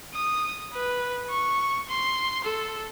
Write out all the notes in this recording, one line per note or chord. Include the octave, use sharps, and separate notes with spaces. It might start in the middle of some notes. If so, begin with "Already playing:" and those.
D#6
B4
C#6
C6
A4